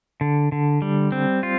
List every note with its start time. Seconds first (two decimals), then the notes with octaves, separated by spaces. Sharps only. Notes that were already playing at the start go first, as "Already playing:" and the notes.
0.21 D3
0.52 D3
0.82 G3
1.12 C4
1.43 F4